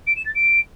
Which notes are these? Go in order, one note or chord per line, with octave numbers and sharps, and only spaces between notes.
D7
E7
A6
D7